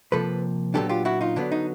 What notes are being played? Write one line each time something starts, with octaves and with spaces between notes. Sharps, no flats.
C3 F3 A#3 A4 B4
A#2 F#3 B3 D4 G4 A4
F4 G4
E4 F#4
D#4 F4
D3 F#3 B3 D4
D#4